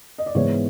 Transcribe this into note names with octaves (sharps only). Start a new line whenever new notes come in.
D#5
D5
G#2 E3 G#3 B3 C#5